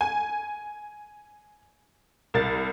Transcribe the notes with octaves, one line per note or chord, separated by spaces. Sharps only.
G#5
C2 A#4 A6